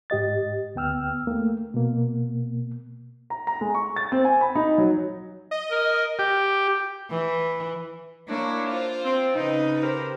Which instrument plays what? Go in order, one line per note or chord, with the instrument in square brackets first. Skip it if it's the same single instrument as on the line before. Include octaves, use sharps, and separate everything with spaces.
[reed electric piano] G#2 G4 D#5 A6
D2 B3 G5 E6 F6
A3 A#3
B2 A#3
[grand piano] A#5
A#5
G#3
C#6
A6
C4
G#5
B5
D#4
F#3
[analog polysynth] D#5
[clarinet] A#4
[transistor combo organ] G4
[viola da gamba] E3
[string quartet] A#3 E4 C#5 [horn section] D4
[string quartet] F4 C5
[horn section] C4
[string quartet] C#3 B4 [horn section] D#4
[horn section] G4 A#4 C5